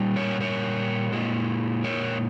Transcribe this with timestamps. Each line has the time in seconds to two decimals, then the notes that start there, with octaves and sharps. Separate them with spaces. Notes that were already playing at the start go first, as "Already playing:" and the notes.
Already playing: A#2 G3
0.16 A#4 C#5
0.41 A#4 C#5
1.12 A#2 G#3
1.84 A#4 C#5